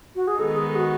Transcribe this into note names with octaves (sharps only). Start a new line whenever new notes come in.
F#4
G#4
D#3 G#3 B3 D#4 A4
G#4
F#4